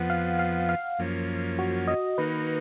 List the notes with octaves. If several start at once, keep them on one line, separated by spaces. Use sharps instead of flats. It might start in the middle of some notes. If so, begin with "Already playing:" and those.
Already playing: F2 F3 B3 F#5
F5
F5
F5
F#2 F3 A#3 C#4
F#4
D#5
D#3 A#3 D#4 F#4 B4